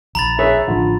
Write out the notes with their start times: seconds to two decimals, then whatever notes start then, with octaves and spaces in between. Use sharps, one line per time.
0.15 A#1 A#5 B5 A6
0.39 G#4 B4 C#5 E5
0.68 A1 D3 F3 F4